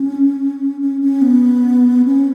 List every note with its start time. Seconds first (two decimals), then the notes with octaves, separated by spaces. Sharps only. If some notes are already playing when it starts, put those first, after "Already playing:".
Already playing: C#4
0.80 C#4
1.01 C#4
1.22 B3
2.05 C#4